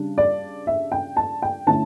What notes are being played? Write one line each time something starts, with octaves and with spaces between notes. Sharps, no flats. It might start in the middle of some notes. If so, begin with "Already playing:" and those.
Already playing: C#3 G3 D4
D5
E5
G5
A5
G5
D3 A3 C#4 E4 A5